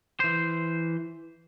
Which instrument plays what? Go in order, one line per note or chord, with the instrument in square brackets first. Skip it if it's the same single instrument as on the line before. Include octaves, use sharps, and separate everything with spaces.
[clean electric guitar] E3 C5